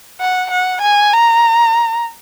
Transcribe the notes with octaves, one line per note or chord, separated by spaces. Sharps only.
F#5
F#5
G#5
A#5